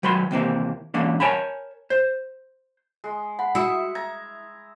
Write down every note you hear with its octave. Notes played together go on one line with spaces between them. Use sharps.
D#3 F#3 B4 B5 C6
D#2 C3 E3 A#3
E3 A#3 C#4 D4
A#4 C#5 G#5 A5 B5
C5
G#3
F#5 B5
E4 F#4 E5 D#6 E6 C#7
A#5 G#6